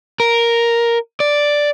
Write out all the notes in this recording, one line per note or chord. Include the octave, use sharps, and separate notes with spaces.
A#4
D5